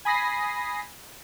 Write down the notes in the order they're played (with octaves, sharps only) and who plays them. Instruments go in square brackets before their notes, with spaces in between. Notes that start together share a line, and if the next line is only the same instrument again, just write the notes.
[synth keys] G#5 B5 D#6 A#6 C7